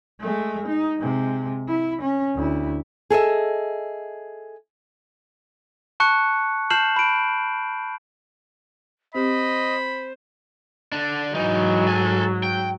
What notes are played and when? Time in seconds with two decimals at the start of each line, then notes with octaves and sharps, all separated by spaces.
0.21 G#3 A3
0.67 D#4
0.98 C3 G#3
1.68 E4
2.02 C#4
2.35 D2 E4
3.10 G#4 A4 D#5 E5
6.00 A5 C#6 F#6 C#7
6.70 A5 F6 G6 C7 E7 F#7
6.96 B5 D7
9.15 C4 G4 C5 D#5 B5
10.92 D3 D4
11.35 G#2 E3 F#3 D#4
11.87 A4 G#5
12.43 G5